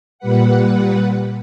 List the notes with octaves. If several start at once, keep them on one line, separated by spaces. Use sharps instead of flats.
A#2 G3 B4 F#5